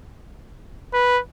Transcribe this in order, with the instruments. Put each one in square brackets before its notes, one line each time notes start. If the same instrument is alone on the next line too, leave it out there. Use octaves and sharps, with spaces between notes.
[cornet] B4